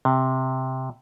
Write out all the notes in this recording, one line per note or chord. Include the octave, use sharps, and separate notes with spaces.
C3